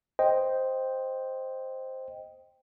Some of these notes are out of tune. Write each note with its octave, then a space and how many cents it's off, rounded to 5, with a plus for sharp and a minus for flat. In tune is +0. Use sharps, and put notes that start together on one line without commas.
C5 +0 D#5 +0 G5 +0